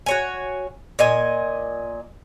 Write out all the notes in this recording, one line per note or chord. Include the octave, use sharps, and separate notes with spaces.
F#4 C#5 G#5
A#2 D#5 G#5